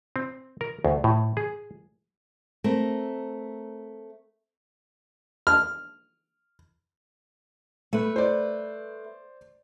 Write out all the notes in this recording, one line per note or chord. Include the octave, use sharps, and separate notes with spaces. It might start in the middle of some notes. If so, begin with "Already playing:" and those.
C4
A#4
D2
A2
G#4
A3 C4 A#4
F6
A3 B4
C5 D5